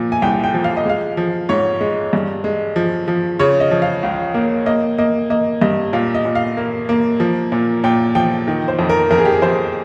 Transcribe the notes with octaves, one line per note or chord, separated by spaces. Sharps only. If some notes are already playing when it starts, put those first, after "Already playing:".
Already playing: A#2 F3
G#5
C2 G5
G5
F3
F5
D#5
G#3 F5
F3
G#2 C#5
G#3
G2
G#3
F3
F3
C#3 C#5
D#5
F3
F5
C#2
A#3
A#3 D#5
A#3 D#5
A#3 D#5
G2 D#5
A#2 F5
D#5
A#2
F5
A#3
A#3
F3
A#2
A#2 G5
F3 G5
D#3
C5
F2
A#4
F2 A#4
G#4
G4
G#4
F2 C5